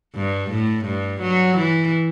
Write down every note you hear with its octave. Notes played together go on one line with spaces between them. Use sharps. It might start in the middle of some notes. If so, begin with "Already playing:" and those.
G2
A2
G2
F#3
E3